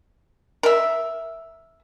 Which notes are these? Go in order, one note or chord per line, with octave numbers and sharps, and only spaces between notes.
A#4 E5